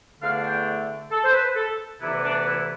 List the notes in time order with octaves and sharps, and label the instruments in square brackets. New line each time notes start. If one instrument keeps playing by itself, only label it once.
[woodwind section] E2 D3 A3 D4 F5
G5
A4
C5
B4
A4
D2 C3 E3 B3 E4
D4
E4